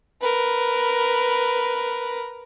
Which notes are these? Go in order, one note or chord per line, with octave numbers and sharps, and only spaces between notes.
A#4 B4